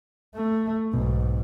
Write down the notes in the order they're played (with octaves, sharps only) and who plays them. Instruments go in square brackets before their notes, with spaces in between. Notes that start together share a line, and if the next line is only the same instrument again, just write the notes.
[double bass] A3
[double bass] B1 G#2 [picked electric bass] B2